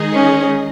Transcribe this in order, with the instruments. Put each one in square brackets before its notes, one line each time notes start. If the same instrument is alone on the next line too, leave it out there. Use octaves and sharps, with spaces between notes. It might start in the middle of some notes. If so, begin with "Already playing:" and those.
Already playing: [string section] D#3 G#3 D#4 G#4 D#5
[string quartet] C#4